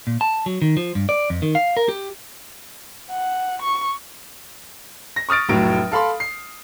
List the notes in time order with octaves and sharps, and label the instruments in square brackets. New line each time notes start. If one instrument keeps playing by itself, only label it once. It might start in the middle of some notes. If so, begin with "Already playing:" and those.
[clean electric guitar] A#2
A5
F#3
D#3
F3
G2
D5
F2
D#3
F5
A#4
G4
[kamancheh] F#5
C#6
[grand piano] A#6
C#6 D#6 F6 A6 D7
F1 A2 F#3 D7
A4 F5 B5 C6
C7